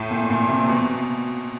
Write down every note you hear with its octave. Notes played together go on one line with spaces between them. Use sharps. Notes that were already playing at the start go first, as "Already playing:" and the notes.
Already playing: A2
A#2
A#2
C3
B2